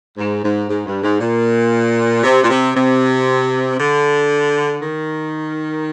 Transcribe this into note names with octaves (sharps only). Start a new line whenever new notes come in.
G#2
G#2
G#2
G2
G#2
A#2
C3
A#2
C3
C3
D3
D#3